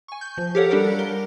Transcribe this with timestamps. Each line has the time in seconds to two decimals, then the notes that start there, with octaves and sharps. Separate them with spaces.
0.08 G#5 C#6
0.21 G6
0.38 F3
0.55 G4 A4 A#4 C#5 F5 F#5
0.70 G3 D4 G4 A4 A#4 F#5
0.99 A#4 G7